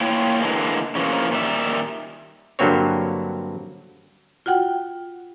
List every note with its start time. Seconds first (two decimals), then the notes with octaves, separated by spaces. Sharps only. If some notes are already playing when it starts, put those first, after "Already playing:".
0.01 A#3 E4 F4 C#5 G5
0.40 D3 E3 G#3 A#3
0.95 C#3 E3 F3 A#3
1.31 A#2 D#3 G3 E5
2.59 G2 D3 F#3 A#3 C4 C#5
4.46 F4 F#4 F#5 G5